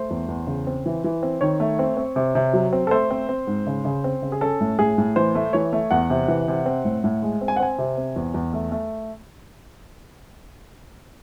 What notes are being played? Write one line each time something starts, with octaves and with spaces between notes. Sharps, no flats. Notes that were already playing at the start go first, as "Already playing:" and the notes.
Already playing: A3 C5
E2
E2
C#3
C4
E3
E3
C4
D#3 C#5
A3
C4
C4
C3
C3
F#3
C4
A4
A3 C5
C4
C4
G#2
C#3
C#3
C4
C#3
G#4
C#4 A4
A2
A2 G#4
A2
E3 C5
A3
E3 C#5
A3
E2 F#5
C3
E3
C3
C4
A2
A2
G#3
C4
G#5
F#5
C4 G#5
C3
C4
E2
E2
A3
A3